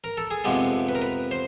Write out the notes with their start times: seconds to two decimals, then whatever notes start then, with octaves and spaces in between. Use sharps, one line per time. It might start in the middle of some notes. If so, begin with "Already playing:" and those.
0.04 A#4
0.17 A4
0.31 G#4
0.44 F2 C3 F3 G#3 B3 G4
0.89 B4
0.95 A#4
1.02 B4
1.31 C5